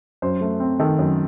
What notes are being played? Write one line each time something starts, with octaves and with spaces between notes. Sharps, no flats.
F#2 C5
A3
C4
D#3 A4
F#2